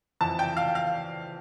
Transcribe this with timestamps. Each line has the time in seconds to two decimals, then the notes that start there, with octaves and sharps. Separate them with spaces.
0.21 F2 E3 A5
0.39 G5
0.57 F5
0.75 F5